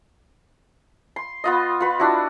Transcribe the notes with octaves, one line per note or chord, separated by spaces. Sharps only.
C6
B3 F4 D#5
F4 B4
D4 E4 F#4